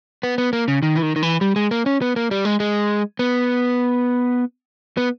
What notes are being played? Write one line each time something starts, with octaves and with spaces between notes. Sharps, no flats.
B3
B3
A#3
C#3
D#3
E3
D#3
D#3
E3
G3
G#3
A#3
C#4
B3
A#3
G3
G#3
G#3
B3
B3